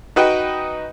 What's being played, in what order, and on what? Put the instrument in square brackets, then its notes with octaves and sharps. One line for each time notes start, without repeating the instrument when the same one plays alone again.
[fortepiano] D#4 F#4 B4 D#5 G5